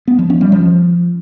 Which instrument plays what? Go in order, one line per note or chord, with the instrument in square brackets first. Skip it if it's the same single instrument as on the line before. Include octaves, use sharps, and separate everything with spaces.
[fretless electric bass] B3
F3
C#4
G3
F3